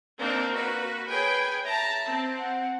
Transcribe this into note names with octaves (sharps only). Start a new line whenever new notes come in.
A#3 C4 D4 D#4
F#4 B4
G#4 B4 C#5 G5 G#5
E5 A5 A#5
C4
F#5